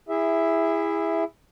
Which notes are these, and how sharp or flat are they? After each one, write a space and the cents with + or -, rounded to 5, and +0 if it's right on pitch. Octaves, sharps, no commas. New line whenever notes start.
E4 +0 G#4 -25 E5 +0